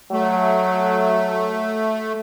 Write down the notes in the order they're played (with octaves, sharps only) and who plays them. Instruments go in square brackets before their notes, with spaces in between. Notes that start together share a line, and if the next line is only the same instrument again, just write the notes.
[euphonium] F#3 [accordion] A3